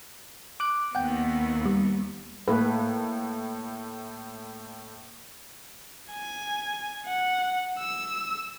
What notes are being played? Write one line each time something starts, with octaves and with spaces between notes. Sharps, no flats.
D6 F#6 D7
D#2 B3 F#5 G5
G3
A2 A#3 B4
G#5
F#5
E6